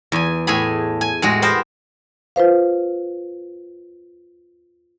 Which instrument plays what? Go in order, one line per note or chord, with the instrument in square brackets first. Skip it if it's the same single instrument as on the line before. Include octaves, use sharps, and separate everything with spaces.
[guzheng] E2 G#5
A2 A3 G#4 G#5 B5
G#5
A2 G#3 F#4
B3 G4 A#4 C5
[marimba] F4 B4 C5 F5